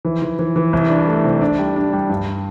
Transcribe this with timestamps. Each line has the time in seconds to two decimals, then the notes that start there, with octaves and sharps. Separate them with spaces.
0.05 E3
0.22 E3
0.39 E3
0.56 E3
0.73 C2
0.90 D4
1.08 A3
1.24 C3
1.41 D4
1.59 G3
1.76 D4
1.93 G3
2.09 G2